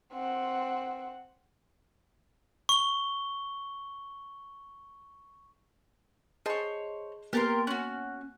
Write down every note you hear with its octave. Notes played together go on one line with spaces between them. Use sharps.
C4 F#5
C#6 G7
G#4 C5 C#5 D#5 A5
A#3 B3 G4 A#4 C6 A6
C#4 D4 F#4 F#6